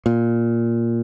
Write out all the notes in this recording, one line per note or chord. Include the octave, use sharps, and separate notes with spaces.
A#2